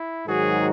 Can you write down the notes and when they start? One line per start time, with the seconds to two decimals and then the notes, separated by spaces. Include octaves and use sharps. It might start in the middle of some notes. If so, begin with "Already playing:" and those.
Already playing: E4
0.27 G#2 D#3 F#3 F#4 G#4